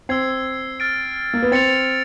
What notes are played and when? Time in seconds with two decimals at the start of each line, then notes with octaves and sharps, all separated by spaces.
0.09 C4 E6 G#6 C7
0.80 F6 A6 D7
1.34 A#3
1.42 B3
1.52 C4 A6 C#7 F7